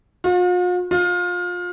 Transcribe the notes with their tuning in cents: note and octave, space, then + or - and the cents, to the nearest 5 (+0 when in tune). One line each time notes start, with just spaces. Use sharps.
F4 +45
F4 +25